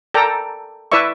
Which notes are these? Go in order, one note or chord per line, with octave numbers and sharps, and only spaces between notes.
A4 A#4 D5 G5 A#5
E4 B4 D5 E5 C#6